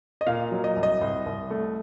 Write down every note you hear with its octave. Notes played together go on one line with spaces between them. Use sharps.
D#5
A#2 F5
F#3
D#5
C2
D#5
C2
C2
A3